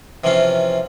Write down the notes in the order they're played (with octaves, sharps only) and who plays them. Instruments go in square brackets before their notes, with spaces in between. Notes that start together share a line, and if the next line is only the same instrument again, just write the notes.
[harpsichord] C3 E3 F3 C#4 F4